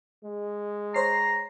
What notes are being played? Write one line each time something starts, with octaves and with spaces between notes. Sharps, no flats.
G#3
C5 C#5 A#5 C7